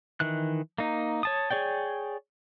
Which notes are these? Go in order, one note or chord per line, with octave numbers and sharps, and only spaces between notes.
D#3 E3 F#6
A#3 D#4
C#5 A5 D#6
G#4 C#5 D5 G5